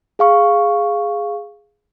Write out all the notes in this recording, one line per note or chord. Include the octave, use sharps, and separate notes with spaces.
G#4 F5 C#6